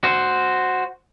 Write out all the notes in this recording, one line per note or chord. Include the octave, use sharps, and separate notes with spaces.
F#4 C5